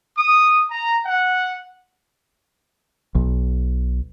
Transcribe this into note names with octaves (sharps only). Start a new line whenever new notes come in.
D#6
A#5
F#5
B1